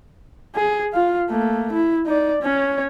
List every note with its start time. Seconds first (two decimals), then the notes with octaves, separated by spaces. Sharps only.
0.55 G#4
0.93 F4 F5
1.30 A3 A#3
1.72 E4
2.06 D#4 D5
2.43 C#4 C#5